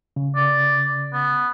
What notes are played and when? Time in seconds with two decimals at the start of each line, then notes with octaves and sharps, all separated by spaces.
0.16 C#3
0.36 D5
1.13 B3